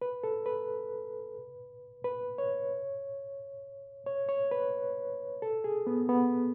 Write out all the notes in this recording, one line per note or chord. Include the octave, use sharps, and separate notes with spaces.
B4
A4
B4
B4
C#5
C#5
C#5
B4
A4
G#4
B3
B3